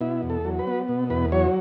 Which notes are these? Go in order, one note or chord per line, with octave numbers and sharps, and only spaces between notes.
B2 E4
E2
A4
F#3
B4
B3
B2
E2 B4
F#3 C#5